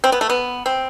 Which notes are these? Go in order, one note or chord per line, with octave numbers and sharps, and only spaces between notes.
C4
B3
A3
B3
C4